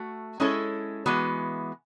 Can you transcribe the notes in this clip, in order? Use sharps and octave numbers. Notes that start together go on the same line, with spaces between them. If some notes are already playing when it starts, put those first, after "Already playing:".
Already playing: A3 F#4
G#3 C#4 E4 A4 C#5
E3 G#3 B3 F#4